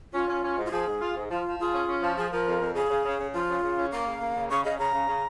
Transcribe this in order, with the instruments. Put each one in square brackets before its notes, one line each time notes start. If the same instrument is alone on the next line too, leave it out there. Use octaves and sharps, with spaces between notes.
[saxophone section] C#4 [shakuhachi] F4
[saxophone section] C#4
C#4
G#2
[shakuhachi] F4
[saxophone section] F3 [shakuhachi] G#4
[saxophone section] G#2
F4
G#2
[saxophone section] F3 [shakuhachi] F4
[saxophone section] F3
[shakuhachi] F4 [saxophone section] G#4
[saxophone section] C#4
C#4
F3
[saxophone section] F3 [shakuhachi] G#4
[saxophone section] F3 [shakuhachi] A#4
[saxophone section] F2
F2
[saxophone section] C#3 [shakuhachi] G#4
[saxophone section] C#3
C#3
C#3
[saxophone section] F3 [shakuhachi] F4
[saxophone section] C#3
C#3
C#4
[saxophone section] A#3 [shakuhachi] F5
[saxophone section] C#3
A#3
C#3
[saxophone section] C#3 [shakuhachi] C#6
[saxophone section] C#3 [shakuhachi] D#5
[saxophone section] C#3 [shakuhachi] A#5
[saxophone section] C#3
C#3